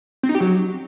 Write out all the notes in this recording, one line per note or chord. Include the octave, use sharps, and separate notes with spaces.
C4
D#4
G4
F#3